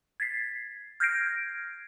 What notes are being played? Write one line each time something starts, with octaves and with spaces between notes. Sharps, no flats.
G#6 A6 B6 C7
F6 G6 G#6 A#6 C7 D7